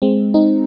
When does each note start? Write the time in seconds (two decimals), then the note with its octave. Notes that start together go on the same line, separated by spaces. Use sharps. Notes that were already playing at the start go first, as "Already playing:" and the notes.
0.02 G#3 C4
0.34 C4 D#4